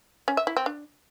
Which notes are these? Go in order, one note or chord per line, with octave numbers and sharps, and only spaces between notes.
C#4
E5
E4
C4
D4